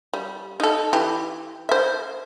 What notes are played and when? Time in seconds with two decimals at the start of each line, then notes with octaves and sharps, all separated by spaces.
0.14 G3
0.60 D#4 A4
0.93 E3 G4
1.69 C5 E5